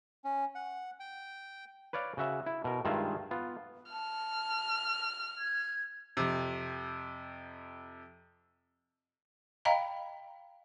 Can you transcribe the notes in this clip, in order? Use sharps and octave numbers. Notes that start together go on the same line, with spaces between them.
C#4
F#5
G5
B4 C#5 D5 F5
C#3 F#4 E5
E4
B2 A#4
G2 D#3 G#3 F4 G#4 E5
B3 F4
A5 F6
G#6
F2 C3
D#5 F5 G5 A#5 B5